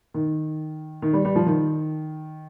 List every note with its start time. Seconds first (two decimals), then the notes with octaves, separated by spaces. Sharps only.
0.14 D#3
1.02 D#3
1.13 G3
1.25 G3
1.36 F3
1.46 D#3